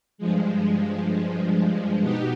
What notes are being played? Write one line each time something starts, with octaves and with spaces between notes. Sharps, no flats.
G2 F3 G#3
B2 B3 D#4 G4